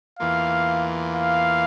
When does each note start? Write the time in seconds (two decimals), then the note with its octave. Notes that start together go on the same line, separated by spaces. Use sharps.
0.19 E2 E3 A#3 F4 F5
1.15 F5